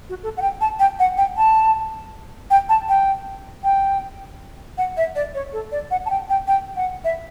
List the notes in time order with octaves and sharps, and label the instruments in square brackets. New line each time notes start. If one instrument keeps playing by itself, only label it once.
[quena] F#4
A4
F#5
G5
A5
G5
F#5
G5
A5
G5
A5
G5
G5
F#5
E5
D5
C#5
A4
D5
F#5
A5
G5
G5
G5
F#5
E5